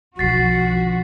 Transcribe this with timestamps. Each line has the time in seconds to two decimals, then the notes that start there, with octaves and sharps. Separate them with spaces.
0.19 B1 D3 F3 F#4 A6 B6 C7